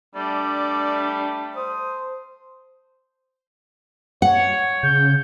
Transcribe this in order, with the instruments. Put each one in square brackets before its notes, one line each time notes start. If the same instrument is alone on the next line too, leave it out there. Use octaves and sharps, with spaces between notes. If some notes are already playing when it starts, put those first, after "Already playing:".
[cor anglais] G3 [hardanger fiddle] A3 [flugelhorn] D4 [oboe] D5
[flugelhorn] C5 [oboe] D#6
[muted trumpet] C#5 [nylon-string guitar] F#5
[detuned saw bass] C#3 [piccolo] G6